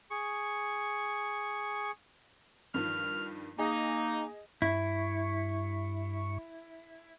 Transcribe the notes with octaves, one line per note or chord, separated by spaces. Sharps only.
G#4 C#6
G2 D#3 F3 F6
A#3 D#4 G#4 D#5
G2 E4 C#6